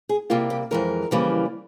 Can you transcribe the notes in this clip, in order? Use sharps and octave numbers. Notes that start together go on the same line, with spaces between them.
G#4
C3 G3 A#3 F4
G4
F2 E3 G#3 A#4
F2 C#3 E3 G3 A#3